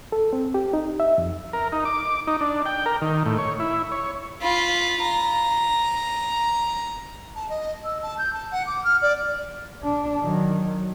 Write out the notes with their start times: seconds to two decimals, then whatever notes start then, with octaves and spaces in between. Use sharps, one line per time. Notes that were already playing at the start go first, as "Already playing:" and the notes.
0.12 A4
0.33 C4
0.54 G4
0.74 D#4
1.00 E5
1.18 F2
1.53 A#4
1.72 D#4
1.85 D6
2.27 D#4
2.41 D4
2.66 G5
2.86 A#4
3.02 D#3
3.26 A2
3.38 C#5
3.60 E4
3.92 C#5
4.41 F4 B5
5.02 A#5
7.35 A5
7.49 D#5
7.84 E6
8.02 A5
8.18 G6
8.33 A5
8.51 F#5
8.66 D6
8.84 F6
9.02 D5
9.83 D4
10.21 D#3 F#3